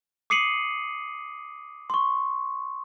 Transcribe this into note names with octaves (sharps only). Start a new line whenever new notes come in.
D6 D#6 C7 C#7 D#7 F#7
C6 C#6